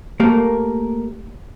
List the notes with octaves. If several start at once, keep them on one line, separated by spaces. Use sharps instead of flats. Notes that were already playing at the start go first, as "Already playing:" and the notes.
A3 A#3 G4 A#4